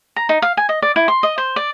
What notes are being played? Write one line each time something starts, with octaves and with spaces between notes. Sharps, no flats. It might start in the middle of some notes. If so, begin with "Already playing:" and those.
A#5
D#4
F5
G#5
D#5
D5
E4
C6
D#5
C5
D5